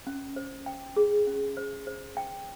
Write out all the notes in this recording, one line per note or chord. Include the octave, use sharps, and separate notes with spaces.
C#4
C5
G5
G#4
C#4
C5
C5
G5